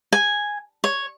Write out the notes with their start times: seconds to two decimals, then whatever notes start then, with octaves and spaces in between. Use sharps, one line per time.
0.13 G#5
0.84 C#5